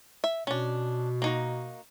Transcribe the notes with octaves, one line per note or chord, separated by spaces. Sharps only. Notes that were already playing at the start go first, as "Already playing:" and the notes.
E5
B2 C#4 D4
A#3 D#4 F#4